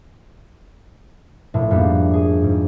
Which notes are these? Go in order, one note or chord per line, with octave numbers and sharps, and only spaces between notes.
A#1 A2
F2 G#2 G3 A#3 B3 D4
G#4
G#2